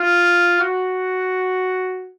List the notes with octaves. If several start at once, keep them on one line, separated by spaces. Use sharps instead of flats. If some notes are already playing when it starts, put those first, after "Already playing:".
Already playing: F4
F#4